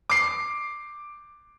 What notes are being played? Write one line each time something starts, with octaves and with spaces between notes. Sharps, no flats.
D6 C7